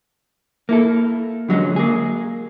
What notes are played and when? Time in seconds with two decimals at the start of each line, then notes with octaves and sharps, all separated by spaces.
0.69 A#3 E4 A4
1.49 D3 F#3 G#3 C#4
1.76 A#3 G#4